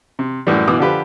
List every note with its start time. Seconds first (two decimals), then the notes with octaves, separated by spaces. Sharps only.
0.19 C3
0.47 F#2 A2 E3 G3
0.67 B2 E3 D6 D#6
0.79 D3 F3 G4 B4